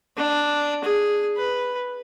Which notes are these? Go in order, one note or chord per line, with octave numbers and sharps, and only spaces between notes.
D4
G#4
B4